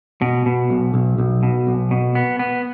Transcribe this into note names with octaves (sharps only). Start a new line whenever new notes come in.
B2
B2
B1
B1
B1
B2
B1
B2
B3
B3